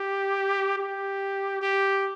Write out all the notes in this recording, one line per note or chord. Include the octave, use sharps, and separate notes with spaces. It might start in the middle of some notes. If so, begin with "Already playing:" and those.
Already playing: G4
G4
G4